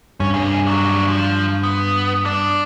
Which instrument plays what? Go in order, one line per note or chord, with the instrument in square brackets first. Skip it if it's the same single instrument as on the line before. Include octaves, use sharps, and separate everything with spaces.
[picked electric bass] G2 [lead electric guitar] C#4
[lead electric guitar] C3 G#4
F#3 D4
F3
B3
D4